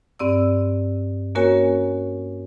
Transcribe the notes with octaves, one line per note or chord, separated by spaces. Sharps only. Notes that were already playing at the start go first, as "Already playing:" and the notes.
G2 C4 D5 E6
A#3 C#4 F#4 A#4 C#5 G#5